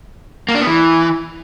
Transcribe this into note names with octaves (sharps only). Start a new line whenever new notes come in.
A#3
D4
B3
E3